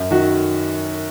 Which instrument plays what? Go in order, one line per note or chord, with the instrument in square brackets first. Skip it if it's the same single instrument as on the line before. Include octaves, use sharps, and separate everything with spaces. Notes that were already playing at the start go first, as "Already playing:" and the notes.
Already playing: [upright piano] F#2
D#3 F#4